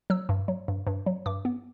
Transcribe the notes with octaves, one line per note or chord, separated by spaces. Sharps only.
F#3 E6
G2
F#3
G2
G2
F#3
G2 D6
B3